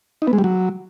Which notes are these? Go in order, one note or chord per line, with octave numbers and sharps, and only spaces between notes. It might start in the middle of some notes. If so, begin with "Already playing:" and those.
D#4
B3
G#3
G3
F#3